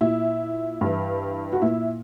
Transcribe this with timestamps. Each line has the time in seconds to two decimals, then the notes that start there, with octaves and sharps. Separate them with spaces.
0.01 A#2 E4
0.81 G2 E3
1.53 F#4
1.62 A#2 E4